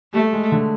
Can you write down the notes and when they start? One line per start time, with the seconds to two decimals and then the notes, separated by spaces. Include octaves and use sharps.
0.13 G3 A3
0.33 G#3
0.52 D3